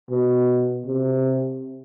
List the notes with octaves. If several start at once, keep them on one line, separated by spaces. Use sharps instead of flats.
B2
C3